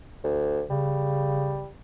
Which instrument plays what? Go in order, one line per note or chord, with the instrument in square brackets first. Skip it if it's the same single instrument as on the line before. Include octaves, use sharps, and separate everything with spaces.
[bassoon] D2
[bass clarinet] C#3 [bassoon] G3